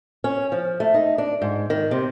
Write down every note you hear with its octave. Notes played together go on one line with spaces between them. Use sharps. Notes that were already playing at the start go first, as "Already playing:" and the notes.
C#4
F3
A3
D#4
D4
G#2
D#3
C3